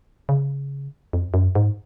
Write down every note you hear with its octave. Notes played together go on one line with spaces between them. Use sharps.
C#3
F2
F#2
G#2